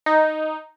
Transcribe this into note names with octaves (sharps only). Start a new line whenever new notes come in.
D#4